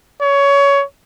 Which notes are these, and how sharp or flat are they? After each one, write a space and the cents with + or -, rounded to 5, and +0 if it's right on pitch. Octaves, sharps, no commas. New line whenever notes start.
C#5 +20